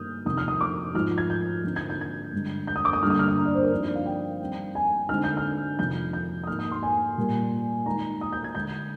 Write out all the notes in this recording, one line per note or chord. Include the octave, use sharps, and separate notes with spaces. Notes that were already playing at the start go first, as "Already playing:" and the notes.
Already playing: G2 D#3 A#3 D4 D#6 F6 G6
F2 C3 D#3 D#6
F6
D#6
D6
G#2 F3 G#3 F6
G#6
G6
D3 F3 C4 D#4
G#6
G6
G#6
G2 D3 G#3
G6
D#6
D6
D#6
G2 D3 G3 A#3 F6
D#6
F6
D#6
A#5
D5
C5
A#4
D3 F3 C4 D#4
D5
F5
G5
D#3 G3 C4
G#5
D3 G#3 C4 D#4 F6
G6
F6
F2 C3 D#3 G6
G6
D#6
G#2 D#3 A#3 F6
D#6
C6
G#5
A#2 G3 A#3
D#3 G#3 D#4 A#5
D#6
G6
G#6
D3 G#3 D4 G6